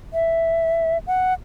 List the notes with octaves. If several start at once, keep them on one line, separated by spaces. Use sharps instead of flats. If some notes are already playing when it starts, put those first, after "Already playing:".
E5
F#5